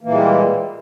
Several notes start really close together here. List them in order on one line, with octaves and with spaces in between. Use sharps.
A#3 E3 A#2 G#3 G3